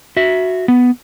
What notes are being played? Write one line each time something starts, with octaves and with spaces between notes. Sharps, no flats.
F#4 E5
B3